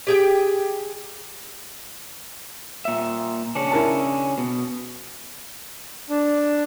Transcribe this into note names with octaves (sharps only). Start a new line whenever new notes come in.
G4 G#4 G5
A#2 E5
C#3 C#4 D4
E4 A#4 A5
B2
D4